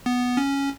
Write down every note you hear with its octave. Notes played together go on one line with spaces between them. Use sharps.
B3
C#4